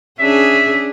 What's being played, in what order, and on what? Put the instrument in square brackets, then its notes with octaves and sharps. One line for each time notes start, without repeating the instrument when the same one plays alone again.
[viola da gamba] C#4 D4 G#4 [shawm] E5